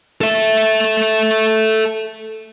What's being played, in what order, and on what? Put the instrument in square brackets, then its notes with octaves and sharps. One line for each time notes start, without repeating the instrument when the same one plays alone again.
[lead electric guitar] A4 E5